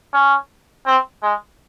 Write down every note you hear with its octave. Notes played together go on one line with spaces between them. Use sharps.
C#4
C4
G#3